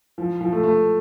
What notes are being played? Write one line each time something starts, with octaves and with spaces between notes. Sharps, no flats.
F3
F3
A3
A3